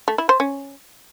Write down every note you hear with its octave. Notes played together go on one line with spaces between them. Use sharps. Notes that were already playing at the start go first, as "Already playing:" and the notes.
A3
E4
C5
C#4